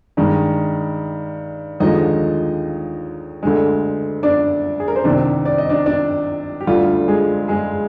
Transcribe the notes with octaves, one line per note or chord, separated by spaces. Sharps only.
G2 D#3 G#3
D#2 D3 F3 G#3 D#4 D#5
D2 D3 G#3
D4 D5
G#4
A#4
C5
C2 C3 D#3 D4 D5
D5
D#5
D4 D5
D4 D5
G4
D2 D3 G3 F4
G#3 G#4
G#3 G#4